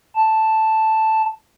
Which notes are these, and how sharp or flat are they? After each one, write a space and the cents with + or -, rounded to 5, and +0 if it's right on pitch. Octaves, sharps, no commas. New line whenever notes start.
A5 +0